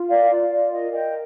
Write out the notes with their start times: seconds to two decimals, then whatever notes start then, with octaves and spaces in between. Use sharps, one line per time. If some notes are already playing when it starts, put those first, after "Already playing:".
Already playing: F4
0.09 A#4 D5 F5
0.30 F4
0.51 F4 D5
0.72 A#4 D#5
0.92 A#4 D#5 G5